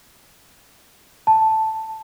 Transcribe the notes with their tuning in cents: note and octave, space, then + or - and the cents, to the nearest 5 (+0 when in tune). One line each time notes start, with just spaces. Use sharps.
A5 +0